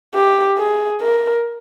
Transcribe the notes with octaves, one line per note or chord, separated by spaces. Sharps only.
G4
G#4
A#4